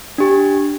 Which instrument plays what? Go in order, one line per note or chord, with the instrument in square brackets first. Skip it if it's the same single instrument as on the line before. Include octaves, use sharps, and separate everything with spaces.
[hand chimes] D4 G4